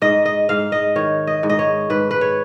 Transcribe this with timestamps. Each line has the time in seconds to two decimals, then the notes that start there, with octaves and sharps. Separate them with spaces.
0.01 G#2 D#5
0.26 D#5
0.49 G#2 F5
0.72 D#5
0.96 D#3 C#5
1.27 D#5
1.43 G#2
1.50 D#5
1.59 C#5
1.90 G#2 B4
2.11 B4
2.21 C#5